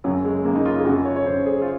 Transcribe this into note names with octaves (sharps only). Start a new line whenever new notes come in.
F#2 C#3 F#3
G#3
F#2 C#3 A#3
D#4
F4
G#4
F#2 C#3 F#4
C#5
C#5
F#2 C#3 C5
G#4
F4